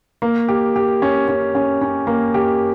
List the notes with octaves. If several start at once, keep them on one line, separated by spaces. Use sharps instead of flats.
A#3
G4
G4
C#4
C#4
C#4
C#4
A#3
G4